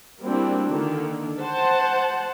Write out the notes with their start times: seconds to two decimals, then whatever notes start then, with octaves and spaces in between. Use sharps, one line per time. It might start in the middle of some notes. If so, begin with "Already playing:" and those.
0.22 G3 A#3 C4 D4 E4 F#4
0.73 D3 D#3 A#3
1.41 C5 F#5 A5